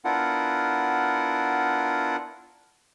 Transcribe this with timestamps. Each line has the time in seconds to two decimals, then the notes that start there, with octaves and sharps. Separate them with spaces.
0.05 B3 D4 E4 F4 A#4 F#5